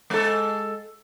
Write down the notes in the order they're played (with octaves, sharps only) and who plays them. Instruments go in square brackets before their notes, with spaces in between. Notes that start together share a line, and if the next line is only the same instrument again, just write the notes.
[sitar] G#3 A4